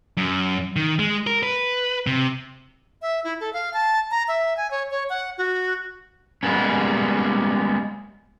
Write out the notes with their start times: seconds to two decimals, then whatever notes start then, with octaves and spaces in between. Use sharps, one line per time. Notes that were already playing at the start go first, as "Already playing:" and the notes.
0.17 F#2
0.76 D#3
0.99 G#3
1.27 A#4
1.43 B4
2.07 C3
3.02 E5
3.24 E4
3.40 A4
3.53 F5
3.74 A5
4.11 A#5
4.28 E5
4.57 G#5
4.71 C#5
4.91 C#5
5.10 F#5
5.38 F#4
6.43 G3 G#3 A#3 B3 C#4